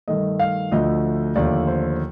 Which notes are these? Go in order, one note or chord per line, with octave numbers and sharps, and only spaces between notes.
G2 D#3 A3 D#5
F5
D2 D3 F3 A3 D#5
D#2 D3 F3 A3 D5
C5